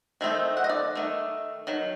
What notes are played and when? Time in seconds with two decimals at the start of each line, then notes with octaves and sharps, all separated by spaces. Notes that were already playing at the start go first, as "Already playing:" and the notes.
0.21 D#3 A3 C4 D#4
0.57 F#5
0.64 D#5
0.69 D5
0.95 D#3 A3
1.67 D#3 F#3